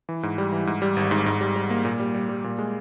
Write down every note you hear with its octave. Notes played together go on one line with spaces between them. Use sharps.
E3
G#2
G3
E3
G#2
G3
G#1
G#2
G#2
G3
G3
A#3
A#2
G3
G3
G3
A#2
G#3